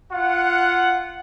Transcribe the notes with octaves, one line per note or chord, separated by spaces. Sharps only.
F4 F#5